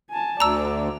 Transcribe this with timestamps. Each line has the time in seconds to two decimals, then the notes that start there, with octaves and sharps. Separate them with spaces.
0.10 G#5 A5
0.40 D2 D5 A#5 E6